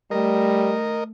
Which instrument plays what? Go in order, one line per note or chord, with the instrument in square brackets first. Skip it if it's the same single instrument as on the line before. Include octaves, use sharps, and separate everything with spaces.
[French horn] G3 [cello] A3 [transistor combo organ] A#4 D#5